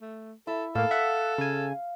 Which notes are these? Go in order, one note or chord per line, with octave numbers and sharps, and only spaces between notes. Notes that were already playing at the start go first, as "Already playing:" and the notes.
A3
E4 A4
A2 A#3 A4 F5
E5 F#5
C#3 G#5